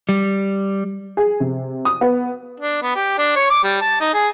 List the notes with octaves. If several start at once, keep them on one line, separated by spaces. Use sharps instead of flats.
G3
G#4
C3
D#6
B3
D4
B3
G4
D4
C#5
D6
G3
A5
D#4
G#4